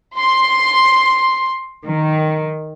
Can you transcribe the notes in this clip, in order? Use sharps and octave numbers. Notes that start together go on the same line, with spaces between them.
C6
D#3